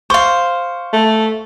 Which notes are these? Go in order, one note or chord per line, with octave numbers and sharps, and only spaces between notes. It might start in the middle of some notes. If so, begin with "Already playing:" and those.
C5 F5 C#6
A3